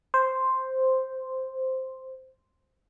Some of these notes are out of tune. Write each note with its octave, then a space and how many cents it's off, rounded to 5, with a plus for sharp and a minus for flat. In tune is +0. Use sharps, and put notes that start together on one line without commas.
C5 +0